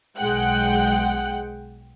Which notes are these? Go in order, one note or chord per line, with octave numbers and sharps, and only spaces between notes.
B1 G#3 F#5 G5 F#6